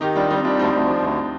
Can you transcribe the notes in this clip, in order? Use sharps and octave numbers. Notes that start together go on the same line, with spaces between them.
D#3 D#4 G4
G3 D4 F4
G3 C4 D#4
G3 D4 F4
D2 C4 D#4
D2
F3
D2